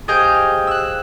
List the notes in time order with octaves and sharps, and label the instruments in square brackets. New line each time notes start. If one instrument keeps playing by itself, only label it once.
[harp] G4 G#4 C5 D#5 F5 G5
E6 F#6